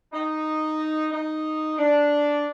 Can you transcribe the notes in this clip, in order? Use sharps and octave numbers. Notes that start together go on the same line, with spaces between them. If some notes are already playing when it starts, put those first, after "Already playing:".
D#4
D#4
D4